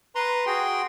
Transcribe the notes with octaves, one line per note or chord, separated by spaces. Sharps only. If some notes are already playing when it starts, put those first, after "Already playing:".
B4 A#5 C6
F#4 G#4 G5 C6